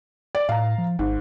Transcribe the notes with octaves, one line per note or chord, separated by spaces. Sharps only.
D5
A2 F5 A#5
F3
G#1 G#2